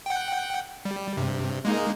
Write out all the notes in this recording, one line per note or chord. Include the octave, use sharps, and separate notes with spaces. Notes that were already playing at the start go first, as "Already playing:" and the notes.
F#5 G5
G3
G2 C3
G#3 A#3 D#4